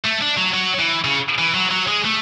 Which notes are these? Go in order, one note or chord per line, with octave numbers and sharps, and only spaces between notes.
A3
D4
F#3
F#3
E3
C#3
E3
F#3
F#3
G#3
A3